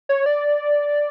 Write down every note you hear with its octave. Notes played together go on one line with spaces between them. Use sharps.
C#5
D5